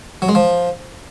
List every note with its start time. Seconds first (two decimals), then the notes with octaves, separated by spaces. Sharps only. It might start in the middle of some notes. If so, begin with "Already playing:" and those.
0.22 F#3
0.29 G#3
0.35 F3